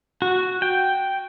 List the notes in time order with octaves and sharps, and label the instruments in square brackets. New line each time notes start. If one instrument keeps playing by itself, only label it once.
[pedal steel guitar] F#4
G5